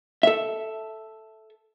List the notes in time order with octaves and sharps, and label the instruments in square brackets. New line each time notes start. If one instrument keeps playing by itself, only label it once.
[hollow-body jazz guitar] A4 E5